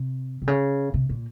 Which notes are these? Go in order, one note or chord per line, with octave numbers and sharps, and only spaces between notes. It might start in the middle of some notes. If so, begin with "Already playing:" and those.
Already playing: C3
C3
C#3
C3
A#2